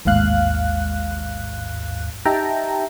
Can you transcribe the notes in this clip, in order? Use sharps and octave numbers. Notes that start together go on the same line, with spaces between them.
A1 D#2 G#2 F5 F#6
D#4 G4 E5 G5 A5 A#5